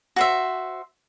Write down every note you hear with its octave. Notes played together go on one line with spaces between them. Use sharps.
F#4 C5 E5